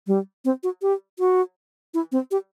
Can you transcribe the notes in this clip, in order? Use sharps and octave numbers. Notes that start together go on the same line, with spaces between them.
G3
C4
F#4
G4
F#4
E4
C4
G4